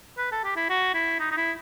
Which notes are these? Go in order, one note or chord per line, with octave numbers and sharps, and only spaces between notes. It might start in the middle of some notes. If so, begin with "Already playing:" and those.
B4
A4
G4
E4
F#4
E4
D#4
D#4
E4